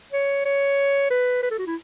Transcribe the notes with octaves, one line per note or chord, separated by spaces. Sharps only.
C#5
C#5
B4
B4
A4
F#4
E4